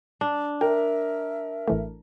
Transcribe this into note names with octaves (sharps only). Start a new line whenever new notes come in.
D4
A#4 E5 G5
A1 E3 A3